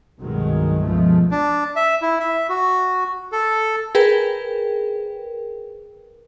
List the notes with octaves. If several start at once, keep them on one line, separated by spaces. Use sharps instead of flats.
C2 G2 B2 D#3 F#3 G#3
C#2 B2 F3 G#3 A3
D4
E5
E4
E5
F#4
A4
G#4 A#4 B4 G5